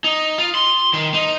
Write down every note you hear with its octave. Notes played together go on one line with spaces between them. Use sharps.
D#4
F4
C6
D#3
D#4